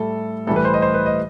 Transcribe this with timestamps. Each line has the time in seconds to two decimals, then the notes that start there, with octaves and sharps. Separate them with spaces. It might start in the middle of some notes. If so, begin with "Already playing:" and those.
Already playing: A2 G3 A4
0.47 A2 E3 G3 A4
0.56 B4
0.65 C5
0.74 D#5
0.82 C5
0.94 B4
1.06 D#5